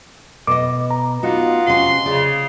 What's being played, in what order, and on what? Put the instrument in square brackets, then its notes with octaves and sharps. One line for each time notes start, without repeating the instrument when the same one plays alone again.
[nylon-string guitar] B2 D#5 [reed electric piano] D6
[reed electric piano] A#5
[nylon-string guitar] B3 D#4 F#4 [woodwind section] F4 D#5 F#5
[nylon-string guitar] C3 C#4 [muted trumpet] C6
[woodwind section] C#3 [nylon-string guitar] D5